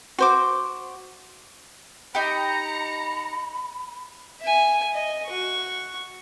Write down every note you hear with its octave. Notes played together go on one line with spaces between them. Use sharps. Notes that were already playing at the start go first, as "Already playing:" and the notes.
F#4 C5 D6
D#4 G4 A#5 B5 C#7
E5 G#5
D#5
F#4 C#6